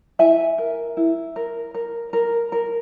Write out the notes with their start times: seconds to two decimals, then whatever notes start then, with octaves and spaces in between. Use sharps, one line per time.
0.19 E4 E5 G#5
0.58 A#4
0.97 E4
1.36 A#4
1.74 A#4
2.13 A#4
2.52 A#4